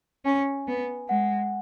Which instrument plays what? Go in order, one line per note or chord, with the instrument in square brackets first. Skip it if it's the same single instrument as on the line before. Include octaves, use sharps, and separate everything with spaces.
[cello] C#4 [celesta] G#5
[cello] B3
[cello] G#3 [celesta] F#5